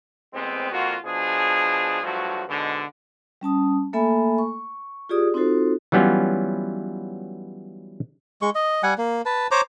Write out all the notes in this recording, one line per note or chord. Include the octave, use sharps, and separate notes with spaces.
A1 G#3 B3 C4
F2 A#3 F4 F#4
B2 F3 D4 G#4
G2 F3 F#3 A3 F#4
G#2 B2 D3
G3 C#4 A5 D#6
A3 A#3 A4 E5 G#5 B5
C#6
F4 G4 G#4 D5 D#6
C4 D#4 F4 F#4 A4 C5
E3 F#3 G3 B3 C#4 F4
G#3 C#6
D#5
G3 F#5 G#5
A#3
B4 A5
C5 C#5 A#5 D6